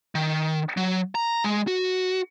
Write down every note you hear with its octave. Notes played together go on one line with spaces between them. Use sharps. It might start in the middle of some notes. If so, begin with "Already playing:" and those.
D#3
F#3
A#5
G#3
F#4